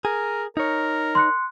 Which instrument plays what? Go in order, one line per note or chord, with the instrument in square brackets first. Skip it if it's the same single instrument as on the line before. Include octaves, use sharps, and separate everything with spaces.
[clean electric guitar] G#4 [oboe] A#4
[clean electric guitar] D#4 C#5 [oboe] A#4
[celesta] C6 F#6 C#7